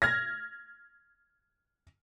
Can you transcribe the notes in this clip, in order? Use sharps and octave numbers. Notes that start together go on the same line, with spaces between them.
F6 G#6 A#6